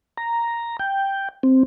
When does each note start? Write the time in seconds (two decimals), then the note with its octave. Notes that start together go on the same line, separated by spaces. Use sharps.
0.18 A#5
0.80 G5
1.43 C4